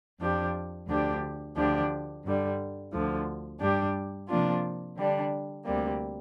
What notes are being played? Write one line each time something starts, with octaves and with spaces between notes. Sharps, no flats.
F2 F3 D4 G4
D2 D3 F3 D4 G4
D2 D3 F3 D4 G4
G2 D3 G3
D2 D3 F3
G2 G3 D4 G4
C3 F3 A#3 D4 F4
D3 G3 D4
D2 C3 G3 A#3